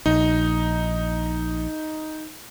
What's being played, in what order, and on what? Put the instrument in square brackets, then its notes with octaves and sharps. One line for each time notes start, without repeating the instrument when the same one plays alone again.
[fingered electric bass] A#1 [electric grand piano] D#4